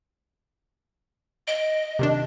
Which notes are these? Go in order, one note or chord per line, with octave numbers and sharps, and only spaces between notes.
D#5 D7
C3 D#3 D4